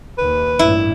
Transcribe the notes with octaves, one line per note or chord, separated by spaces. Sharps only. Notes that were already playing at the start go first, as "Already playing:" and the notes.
D#2 B4
A1 G2 A#2 E4